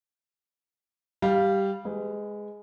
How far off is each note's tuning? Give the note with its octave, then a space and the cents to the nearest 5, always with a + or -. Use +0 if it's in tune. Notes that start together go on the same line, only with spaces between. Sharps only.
G3 +0 F5 +0
G#3 +0 B4 +30